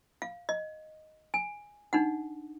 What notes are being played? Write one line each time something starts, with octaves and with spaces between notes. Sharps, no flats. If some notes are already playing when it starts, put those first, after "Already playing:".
F5
D#5
G#5
D4 D#4 F#5